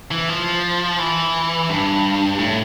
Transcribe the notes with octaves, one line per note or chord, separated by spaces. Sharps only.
E3
F3
E3
G2
A2